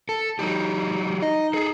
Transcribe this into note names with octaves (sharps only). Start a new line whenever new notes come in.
A4
F#3 D#4 G4
D#4 D#5
G#4 A4